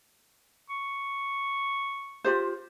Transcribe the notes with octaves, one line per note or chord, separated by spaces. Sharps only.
C#6
F4 G4 C5